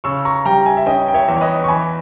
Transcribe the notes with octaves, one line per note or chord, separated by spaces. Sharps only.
C#3 C#6 E6
A#5 C#6
G3 G5 A#5
E5 G#5
E5
C#4 D#5 G5
G5
C#5 E5
E2
C#5
B4 D#5
C#6
E3 G#5 B5